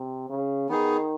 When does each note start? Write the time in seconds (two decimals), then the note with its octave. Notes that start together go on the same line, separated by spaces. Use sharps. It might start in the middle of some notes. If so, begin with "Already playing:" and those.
Already playing: C3
0.30 C#3
0.69 D#3 B3 D#4 G#4